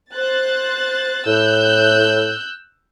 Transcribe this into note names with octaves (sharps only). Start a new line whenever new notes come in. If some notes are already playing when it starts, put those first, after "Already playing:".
C5 F#6 A6
A2 E6 F#6 G6